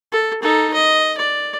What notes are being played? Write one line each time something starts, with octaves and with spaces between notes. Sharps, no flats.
A4
D#4 A4
D#5
D5